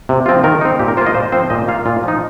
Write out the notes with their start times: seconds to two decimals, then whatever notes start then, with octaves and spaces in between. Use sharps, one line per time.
0.09 C3
0.26 F3 C4 F4
0.43 D#3 A#4
0.61 C4 D#4
0.79 A#2 G4
0.88 A#4
0.97 A#3 F4 C5
1.06 D#5
1.14 A#2 C5
1.32 F3 C4 C5
1.50 A#2 D#5
1.68 A#3 F4 F5
1.85 A#2 F4
2.03 F3 D#4